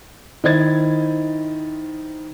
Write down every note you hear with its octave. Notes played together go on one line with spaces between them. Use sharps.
D#3 E4 C5 D#5 G#6 A6